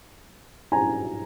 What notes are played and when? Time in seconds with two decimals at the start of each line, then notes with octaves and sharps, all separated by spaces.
0.72 G#5 A#5